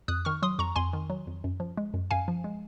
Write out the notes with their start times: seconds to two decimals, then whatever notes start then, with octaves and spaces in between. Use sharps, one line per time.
0.08 F2 D#6 F#6
0.25 D#3 C#6 F6
0.42 F#3 C6 D#6
0.59 F2 A#5 C#6
0.76 F2 G#5 C6
0.93 D#3
1.10 F#3
1.27 F2
1.44 F#2
1.60 F3
1.77 G#3
1.94 F#2
2.11 F#2 F5 G#5
2.28 F3
2.44 G#3